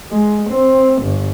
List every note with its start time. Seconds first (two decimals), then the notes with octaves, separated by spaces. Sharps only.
0.11 G#3
0.49 C4
1.03 G1